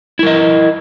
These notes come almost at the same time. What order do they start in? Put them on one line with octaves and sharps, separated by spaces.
E4 A#4 D#5